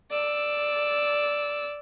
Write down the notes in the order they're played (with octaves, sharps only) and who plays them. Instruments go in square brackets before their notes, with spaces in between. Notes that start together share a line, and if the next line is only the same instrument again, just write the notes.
[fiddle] D5 E6